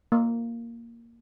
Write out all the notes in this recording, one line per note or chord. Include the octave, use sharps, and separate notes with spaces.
A#3